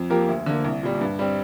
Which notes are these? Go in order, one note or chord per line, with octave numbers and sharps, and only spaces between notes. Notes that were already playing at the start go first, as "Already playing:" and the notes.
Already playing: F2
F3 A#3 G4 A#4
D2
D3 A#3
C2
A#2 G3
G2
G3 C4